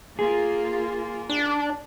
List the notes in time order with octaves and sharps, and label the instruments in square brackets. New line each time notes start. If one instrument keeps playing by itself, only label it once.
[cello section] A#3 F4 [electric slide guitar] G#4
[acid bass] D4